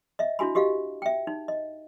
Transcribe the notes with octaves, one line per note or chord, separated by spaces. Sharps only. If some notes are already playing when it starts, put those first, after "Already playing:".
D#5 E5
D4 E4 F#4 G#5 B5
F#4 G4 D#5 F5
E5 G5
D#4
D#5